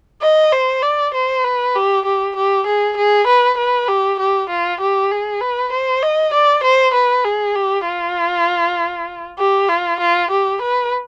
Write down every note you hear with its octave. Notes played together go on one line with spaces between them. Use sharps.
D#5
C5
D5
C5
B4
G4
G4
G4
G#4
G#4
B4
B4
G4
G4
F4
G4
G#4
B4
C5
D#5
D5
C5
B4
G#4
G4
F4
G4
F4
F4
G4
B4